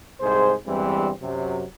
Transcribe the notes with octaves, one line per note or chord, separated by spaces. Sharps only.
C2 G#2 G#4 C5
E2 G2 E3 G3 G#3 C4
F#2 C3 F#3